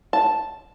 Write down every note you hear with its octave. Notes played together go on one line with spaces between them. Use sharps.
A5